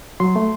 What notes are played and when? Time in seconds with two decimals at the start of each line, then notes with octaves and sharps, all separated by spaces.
0.20 F#3 C6
0.36 A3